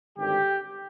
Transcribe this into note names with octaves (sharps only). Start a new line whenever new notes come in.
G#1 G2 D3 G4